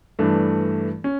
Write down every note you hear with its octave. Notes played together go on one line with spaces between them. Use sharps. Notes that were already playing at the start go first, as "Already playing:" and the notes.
G2 E3 A3 D4
C#4